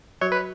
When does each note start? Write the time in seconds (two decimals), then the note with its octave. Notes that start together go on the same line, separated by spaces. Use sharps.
0.21 F#3 F#4 C#5
0.32 B4